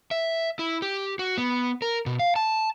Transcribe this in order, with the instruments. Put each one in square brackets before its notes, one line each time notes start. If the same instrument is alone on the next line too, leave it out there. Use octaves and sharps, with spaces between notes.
[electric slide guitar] E5
E4
G4
F#4
B3
A#4
B2
F5
A5